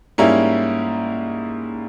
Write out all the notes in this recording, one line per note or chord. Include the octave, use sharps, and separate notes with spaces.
G#2 G3 A#3 C#4 E4